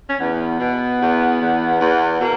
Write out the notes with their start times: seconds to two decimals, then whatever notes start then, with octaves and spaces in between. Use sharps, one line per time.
0.10 C#4
0.20 E2 B3
0.60 B2
1.00 E2
1.41 E2
1.81 E2
2.21 B2 A#3